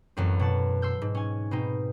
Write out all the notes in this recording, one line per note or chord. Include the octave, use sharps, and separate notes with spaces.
A1 F#2 C4
B2 F#5 A5
C6 E6 G6
G#2
C#4 G#5
B2 C4 D#4